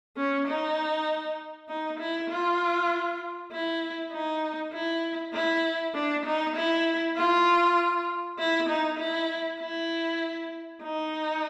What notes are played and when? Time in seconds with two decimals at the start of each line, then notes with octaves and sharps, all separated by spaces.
0.17 C#4
0.48 D#4
1.69 D#4
1.99 E4
2.30 F4
3.52 E4
4.12 D#4
4.74 E4
5.34 E4
5.95 D4
6.26 D#4
6.56 E4
7.17 F4
8.39 E4
8.69 D#4
8.99 E4
9.61 E4
10.83 D#4